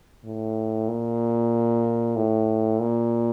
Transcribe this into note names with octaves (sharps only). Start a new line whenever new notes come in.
A2
A#2
A2
A#2